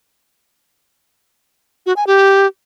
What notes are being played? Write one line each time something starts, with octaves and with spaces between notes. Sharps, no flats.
F#4
G#5
G4